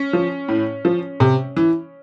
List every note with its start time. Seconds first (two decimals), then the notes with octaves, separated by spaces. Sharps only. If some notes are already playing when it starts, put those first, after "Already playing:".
Already playing: C#4
0.13 F3
0.48 A2
0.85 F3
1.20 C3
1.57 E3